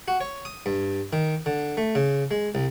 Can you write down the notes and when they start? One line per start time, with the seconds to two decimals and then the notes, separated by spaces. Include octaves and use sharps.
0.08 F#4
0.21 C#5
0.45 D#6
0.66 G2
1.13 D#3
1.46 D3
1.77 A3
1.95 C#3
2.31 G#3
2.55 C2